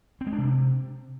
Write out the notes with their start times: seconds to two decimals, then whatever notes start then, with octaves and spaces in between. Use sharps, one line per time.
0.21 C4
0.27 G#3
0.32 D4
0.38 C3